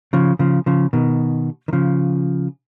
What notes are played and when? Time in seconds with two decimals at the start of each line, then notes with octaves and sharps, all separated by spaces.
0.13 C#3 F3
0.39 C#3 F3
0.66 C#3 F3
0.93 B2 D#3
1.68 D#3
1.73 C#3 F3